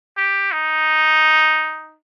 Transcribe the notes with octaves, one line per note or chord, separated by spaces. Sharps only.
G4
D#4